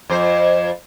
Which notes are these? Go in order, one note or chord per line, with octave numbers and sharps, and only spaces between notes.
F2 C5